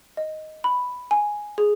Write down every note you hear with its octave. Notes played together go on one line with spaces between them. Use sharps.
D#5
B5
G#5
G#4